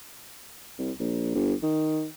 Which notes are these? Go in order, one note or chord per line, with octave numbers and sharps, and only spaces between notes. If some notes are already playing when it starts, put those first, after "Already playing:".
C2
A#1
G1
D#3